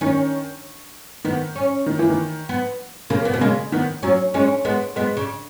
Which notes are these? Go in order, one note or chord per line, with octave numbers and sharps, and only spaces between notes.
D#3 C#4
D#3 B3
C#4
D#3
E3
D#3
B3
C#3 A#3
B3
B2 A#3
C#3 G#3
D#3 B3
F#3 C#4
G#3 C#4
G#3 B3
G#3 B3
C#3